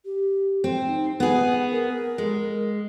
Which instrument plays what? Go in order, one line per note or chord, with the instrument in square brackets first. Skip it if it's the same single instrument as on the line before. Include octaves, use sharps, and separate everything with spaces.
[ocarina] G4
[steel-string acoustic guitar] C4
[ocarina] D#4
[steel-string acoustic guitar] B3 G#4 [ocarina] F#5
[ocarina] A#4
[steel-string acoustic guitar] G#3